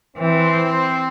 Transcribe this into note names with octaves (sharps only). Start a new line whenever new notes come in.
E3 C4